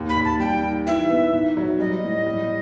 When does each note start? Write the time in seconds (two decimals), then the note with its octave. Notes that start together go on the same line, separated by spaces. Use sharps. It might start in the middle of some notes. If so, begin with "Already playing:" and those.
Already playing: D#2
0.09 B5
0.17 D#2
0.25 A5
0.40 G3 G5
0.63 D#3
0.87 E3 E5
1.10 B3
1.32 D#3
1.57 F#3
1.80 G3 D#5
2.03 A2
2.26 G3